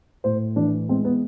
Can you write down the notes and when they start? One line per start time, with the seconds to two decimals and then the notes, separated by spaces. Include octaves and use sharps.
0.24 A2 C5
0.56 E3 D4
0.89 G#3 C4
1.05 B3